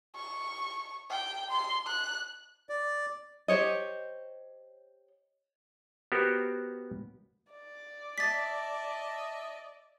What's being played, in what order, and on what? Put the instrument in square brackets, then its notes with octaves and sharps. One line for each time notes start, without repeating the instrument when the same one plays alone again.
[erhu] C#6
G5
C6
F#6
[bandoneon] D5
[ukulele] G4 C5 C#5 D#5
[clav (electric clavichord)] B3 F#4 G4 A#4 C5
[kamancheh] D5
[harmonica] D#5 E5 A5 [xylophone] A6 B6